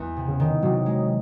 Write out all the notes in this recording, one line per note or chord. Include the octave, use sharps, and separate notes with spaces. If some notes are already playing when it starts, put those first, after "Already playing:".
Already playing: E2
C3
C#3
D#3
C3 F#3
G#3